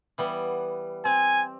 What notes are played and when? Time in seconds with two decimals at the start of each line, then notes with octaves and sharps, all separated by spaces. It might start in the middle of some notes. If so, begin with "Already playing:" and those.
0.18 E3 G3 B3
1.05 C4 G#5